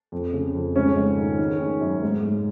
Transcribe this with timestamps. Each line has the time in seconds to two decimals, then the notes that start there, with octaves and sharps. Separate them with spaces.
0.12 F2
0.33 C#3
0.55 F2
0.76 G#2 C#3 C#4
0.96 G#2
1.18 D#3
1.39 D#3
1.60 D#3
1.81 F#2
2.03 G#2
2.23 G#2